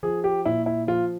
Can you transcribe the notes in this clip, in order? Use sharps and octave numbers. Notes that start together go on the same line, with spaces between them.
F3 G#4
G4
A#2 E4
E4
F3 F4